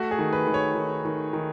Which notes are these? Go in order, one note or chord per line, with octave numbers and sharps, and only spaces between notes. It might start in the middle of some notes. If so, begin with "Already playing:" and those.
Already playing: A3 F#4
G#4
D#3
B4
D#3
C#5
D#3
D#3
D#3